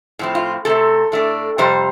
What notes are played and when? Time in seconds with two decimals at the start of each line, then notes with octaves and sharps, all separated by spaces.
0.19 A2 F3 C4
0.35 F4
0.65 C3 A3 C4 A4
1.12 A2 A3 D4
1.58 F2 C3 G3 C5